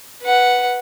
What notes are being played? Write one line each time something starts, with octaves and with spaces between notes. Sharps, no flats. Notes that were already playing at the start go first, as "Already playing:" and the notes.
B4 F#5